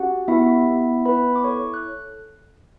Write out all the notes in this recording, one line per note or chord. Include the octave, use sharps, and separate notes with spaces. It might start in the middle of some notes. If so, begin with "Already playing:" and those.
Already playing: C#4 F#4 G4 F#5
B3 E4 E5
B3
E4 B4 B5
D6
A4 C#5 C#6
F#6